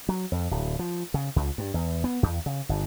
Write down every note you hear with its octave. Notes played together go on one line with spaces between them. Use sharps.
F#3
F2
D1
F3
C#3
C#2
G2
E2
B3
E2
C#3
G1